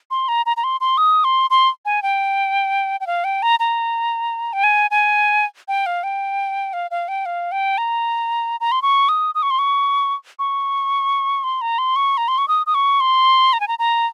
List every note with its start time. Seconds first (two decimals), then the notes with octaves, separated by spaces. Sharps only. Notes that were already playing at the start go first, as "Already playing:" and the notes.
0.11 C6
0.28 A#5
0.46 A#5
0.57 A#5
0.64 C6
0.81 C6
0.98 D#6
1.24 C6
1.50 C6
1.85 G#5
2.03 G5
3.01 G5
3.07 F5
3.24 G5
3.43 A#5
3.59 A#5
4.53 G5
4.64 G#5
4.91 G#5
5.68 G5
5.86 F5
6.03 G5
6.73 F5
6.91 F5
7.08 G5
7.26 F5
7.52 G5
7.78 A#5
8.60 A#5
8.72 C6
8.82 C#6
9.09 D#6
9.35 D#6
9.43 C#6
9.51 C6
9.59 C#6
10.39 C#6
11.44 C6
11.61 A#5
11.78 C6
11.96 C#6
12.17 A#5
12.28 C6
12.38 C#6
12.48 D#6
12.66 D#6
12.75 C#6
13.00 C6
13.53 A#5
13.60 G#5
13.68 A#5
13.79 A#5